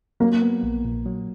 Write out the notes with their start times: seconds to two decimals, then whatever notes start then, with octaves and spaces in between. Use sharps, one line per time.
0.20 F#3 A#3
0.42 B3
0.63 A#1
0.85 A#2
1.06 F#3